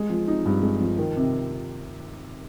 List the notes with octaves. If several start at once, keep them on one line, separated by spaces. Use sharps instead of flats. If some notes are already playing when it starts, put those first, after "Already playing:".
Already playing: G#3
F3
D#4
G2
G#3
F3
D#3
C3